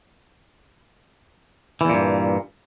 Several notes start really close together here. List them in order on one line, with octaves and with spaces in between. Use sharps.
E3 E2 A#2 G2